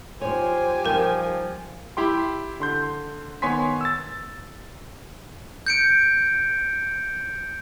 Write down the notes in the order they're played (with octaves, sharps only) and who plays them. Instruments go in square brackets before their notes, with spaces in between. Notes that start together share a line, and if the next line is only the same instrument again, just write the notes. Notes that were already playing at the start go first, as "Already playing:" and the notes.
[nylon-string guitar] F3 D#4 C#5 [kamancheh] G4 G#5 [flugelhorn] C5
[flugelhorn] F3 [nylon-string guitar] G3 D#4 [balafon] A#4 G5
[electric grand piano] E4 G4 G5 C6
D3 C6 G6
D#3 B3 C#5 G#5 C6 B6
E6 A6
[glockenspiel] G6 C#7 D7